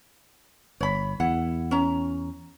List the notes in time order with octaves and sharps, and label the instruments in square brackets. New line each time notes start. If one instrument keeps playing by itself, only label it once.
[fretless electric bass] G1 [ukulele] C#5 B5
[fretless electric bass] E2 [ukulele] E4 F#5
[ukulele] C#4 A#5